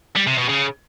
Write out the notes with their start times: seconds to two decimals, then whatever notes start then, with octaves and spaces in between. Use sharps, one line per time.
0.16 G3
0.27 C3
0.38 B2
0.49 C#3